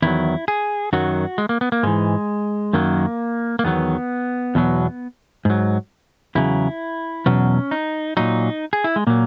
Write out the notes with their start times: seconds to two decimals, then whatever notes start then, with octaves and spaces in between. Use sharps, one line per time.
0.02 E2 D#3 F#3 E4
0.48 G#4
0.93 F#2 D#3 F#3 F#4
1.38 G#3
1.49 A#3
1.61 B3
1.72 A#3
1.83 G#2 E3 G#3
2.73 F#2 D#3 F#3 A#3
3.59 A#3
3.64 E2 D#3 F#3 B3
4.55 E2 B2 F#3
5.45 G#2 F#3
6.35 E2 C#3 F#3 E4
7.26 E2 B2 F#3 C#4
7.71 D#4
8.17 A#2 F#3 D#4
8.73 G#4
8.84 E4
8.96 G#3
9.07 A#2 F#3 A#3